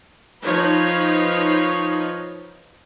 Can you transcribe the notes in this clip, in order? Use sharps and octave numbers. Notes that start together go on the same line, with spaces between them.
F3 D#4 B4 C#5